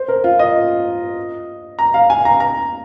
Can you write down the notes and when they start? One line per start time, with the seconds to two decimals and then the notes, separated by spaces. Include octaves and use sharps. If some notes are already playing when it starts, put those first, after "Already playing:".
Already playing: C5
0.08 A#4
0.24 F4
0.39 D#5
1.79 A#5
1.94 F5
2.10 G#5
2.25 A#5
2.40 A#5